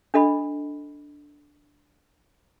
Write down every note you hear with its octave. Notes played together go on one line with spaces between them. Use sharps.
D4 A4 D#5 B5